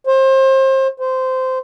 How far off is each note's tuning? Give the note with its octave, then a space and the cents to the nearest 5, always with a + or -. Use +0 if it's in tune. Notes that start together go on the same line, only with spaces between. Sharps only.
C5 +30
C5 -15